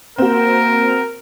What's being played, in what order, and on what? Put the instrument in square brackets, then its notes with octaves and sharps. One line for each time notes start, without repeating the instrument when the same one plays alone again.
[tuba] A#3 [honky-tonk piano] C4 F#4 [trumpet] A#4